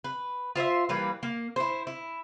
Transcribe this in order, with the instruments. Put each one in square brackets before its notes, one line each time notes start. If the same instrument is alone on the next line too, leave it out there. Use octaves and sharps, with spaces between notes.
[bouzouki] B4
F4 C5 C#5 E5
E3 G3 A#3 B4
A#3
E4 C5
E4